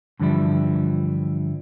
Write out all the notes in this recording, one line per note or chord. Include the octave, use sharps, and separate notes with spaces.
G2 D3 E3 F3 G3 E4